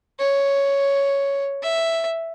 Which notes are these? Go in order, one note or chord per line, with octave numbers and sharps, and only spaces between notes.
C#5
E5